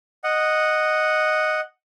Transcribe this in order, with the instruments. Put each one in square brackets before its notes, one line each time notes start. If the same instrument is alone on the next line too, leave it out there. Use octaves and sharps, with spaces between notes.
[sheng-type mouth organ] D#5 F#5